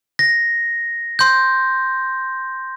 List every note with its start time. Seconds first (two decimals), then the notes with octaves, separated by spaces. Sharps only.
0.19 A#6
1.19 C6 G6